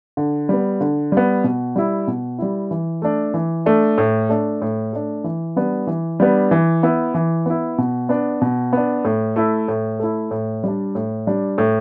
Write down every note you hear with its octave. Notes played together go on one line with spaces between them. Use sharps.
D3
G3 B3
D3
G3 B3
B2
G3 E4
B2
G3 E4
E3
A3 D4
E3
A3 D4
A2
A3 D4
A2
A3 D4
E3
G3 B3 D4
E3
G3 B3 D4
E3
B3 E4
E3
B3 E4
B2
B3 D4
B2
B3 D4
A2
A3 E4
A2
A3 E4
A2
G3 D4
A2
G3 D4
A2